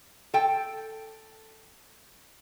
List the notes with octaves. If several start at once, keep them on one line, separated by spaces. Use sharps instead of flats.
A4 G5